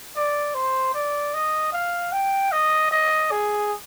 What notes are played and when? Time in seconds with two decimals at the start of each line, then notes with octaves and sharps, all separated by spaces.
0.16 D5
0.55 C5
0.94 D5
1.34 D#5
1.73 F5
2.12 G5
2.52 D#5
2.91 D#5
3.31 G#4